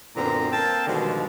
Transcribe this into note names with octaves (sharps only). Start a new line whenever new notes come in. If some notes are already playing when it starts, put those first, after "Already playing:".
F#2 A#2 D3 B3 C4 A#5
A#3 C4 G5 A5
G2 B2 D3 D#3 F3 G#3